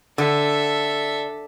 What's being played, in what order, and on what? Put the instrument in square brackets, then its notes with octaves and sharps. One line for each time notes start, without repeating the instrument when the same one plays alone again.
[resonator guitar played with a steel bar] D3 [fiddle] A4 E5